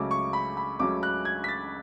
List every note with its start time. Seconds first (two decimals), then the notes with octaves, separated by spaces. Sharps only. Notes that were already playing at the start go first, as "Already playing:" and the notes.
Already playing: C#2 C#3 F#3 A3 C#4 D6
0.11 C#6
0.33 B5
0.57 B5
0.79 C#2 C#3 F#3 A3 C#4 D6
1.03 F#6
1.25 G#6
1.44 B6
1.48 A6